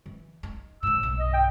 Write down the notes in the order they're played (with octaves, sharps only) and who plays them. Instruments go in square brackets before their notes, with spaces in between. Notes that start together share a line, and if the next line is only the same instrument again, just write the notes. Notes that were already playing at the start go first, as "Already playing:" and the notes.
[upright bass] E3
D#4
[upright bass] A2 D#3 [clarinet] E6
[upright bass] B1 G2
[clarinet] D#5
G5